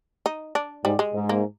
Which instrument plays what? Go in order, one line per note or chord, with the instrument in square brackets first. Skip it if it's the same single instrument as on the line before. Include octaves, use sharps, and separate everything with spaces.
[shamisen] D#4
D4
[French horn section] G#2 [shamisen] G3
[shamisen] G#3
[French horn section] G#2
[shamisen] A#3